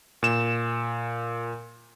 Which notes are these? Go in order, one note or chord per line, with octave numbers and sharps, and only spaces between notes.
A#2 E7